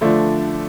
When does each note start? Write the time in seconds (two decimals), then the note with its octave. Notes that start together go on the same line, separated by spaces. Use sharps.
0.01 D3 F3 A3 D4